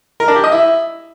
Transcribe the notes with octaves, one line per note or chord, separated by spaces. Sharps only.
A#4
D4
G4
D#5
E4